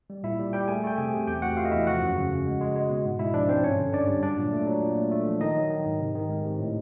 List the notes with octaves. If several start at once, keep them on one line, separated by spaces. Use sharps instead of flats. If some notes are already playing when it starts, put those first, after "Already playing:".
G3
A#2 E4 E5
G3
G3 G4 G5
A3 G#4 G#5
A3 G5
C3 G#4 G#5
C3
E2 G4 G5
A3 F#4 F#5
A3 F4 F5
D#5
E2 E4 E5
F3 F#4 F#5
F#2
C#3
C#3
G#3
G#3
G#3
B2
G#2
G#3 E4 E5
F3 D4 D5
G#2 C4 C5
G2 C#4 C#5
D3
G2 D4 D5
G3
F#3 D4 D5
A#2
A3
F#3
A#2
A3
A3
F3
D#3 D#4 D#5
F#3
D#3
G#2
C3
D#3
G#3
C3
A2